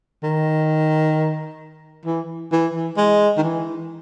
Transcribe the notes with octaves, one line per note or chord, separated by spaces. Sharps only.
D#3
E3
E3
E3
G#3
D#3
E3